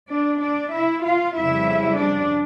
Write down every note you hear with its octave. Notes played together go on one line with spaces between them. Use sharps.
D4 D5
D4 D5
E4 E5
F4 F5
F2 C#3 G3 E4 E5
D4 D5